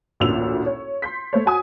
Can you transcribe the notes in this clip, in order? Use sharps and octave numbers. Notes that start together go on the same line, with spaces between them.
A1 D2 A#2 E6 F7
C#5
C6 G6 B6
A3 C5 C#5
F#4 G#5 D#6